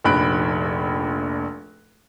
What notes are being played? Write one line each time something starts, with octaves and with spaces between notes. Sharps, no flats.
F1 A#1 B5 F#6 D7